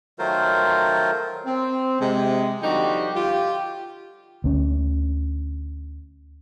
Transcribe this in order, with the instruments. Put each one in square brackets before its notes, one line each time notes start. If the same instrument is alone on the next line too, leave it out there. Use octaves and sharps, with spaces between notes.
[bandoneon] D#3 F#3 A3 F4 A#4 C5
[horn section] C4
C3 G#3
D3 F3 G3 D#4 F#4 G4
F4 G4
[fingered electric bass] D2 C#4